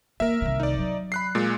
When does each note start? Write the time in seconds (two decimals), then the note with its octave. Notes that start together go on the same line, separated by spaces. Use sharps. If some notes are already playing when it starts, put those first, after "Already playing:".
0.20 A#3 A#4 E5
0.42 C2 D#3
0.60 D#4 D5
0.78 F#3
1.12 B5 F#6 C7
1.35 A#2 G#3